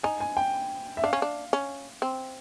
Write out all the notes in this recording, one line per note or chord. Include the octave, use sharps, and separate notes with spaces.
D#4 G#5
G#5
G5
E5
D4 F5
C#4
D4
C#4
C4